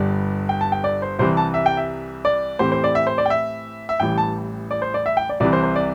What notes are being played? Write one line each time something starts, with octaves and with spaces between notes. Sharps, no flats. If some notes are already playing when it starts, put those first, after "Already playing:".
Already playing: G1 G2 G3 D5
G5
A5
G5
D5
C5
C2 C3 E3 G3 C5
A5
E5
G5
E5
D5
A2 E3 A3 C4 G4 C5
C5
D5
E5
C5
D5
G5
E5
E5
A1 A2 E3 G3 G5
A5
D5
C5
D5
E5
G5
D5
C2 C3 E3 D5
C5
C5
D5